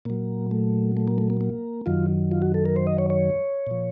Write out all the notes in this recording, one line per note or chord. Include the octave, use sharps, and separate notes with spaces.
A#2 F#3 A#3
A3
A3
A#3
A3
A#3
A#3
F#2 D#3 F#3 F4
F4
F#4
A4
A#4
C5
D#5
C#5
C#5
A#2 F3